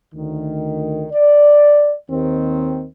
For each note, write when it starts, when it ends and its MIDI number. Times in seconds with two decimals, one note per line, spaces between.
0.15 1.06 38
0.15 1.06 51
1.12 1.94 74
2.10 2.85 39
2.10 2.85 51
2.10 2.85 60